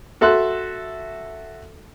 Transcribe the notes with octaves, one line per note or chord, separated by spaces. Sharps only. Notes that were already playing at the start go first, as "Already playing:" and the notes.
F#4 A4 E5 C6 F#6